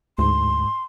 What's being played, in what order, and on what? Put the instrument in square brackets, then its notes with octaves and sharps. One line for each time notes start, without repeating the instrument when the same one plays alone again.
[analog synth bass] D2 [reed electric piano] G#2 [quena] C6